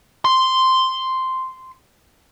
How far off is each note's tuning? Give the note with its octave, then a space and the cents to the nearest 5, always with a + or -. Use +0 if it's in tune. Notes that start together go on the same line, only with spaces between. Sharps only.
C6 -5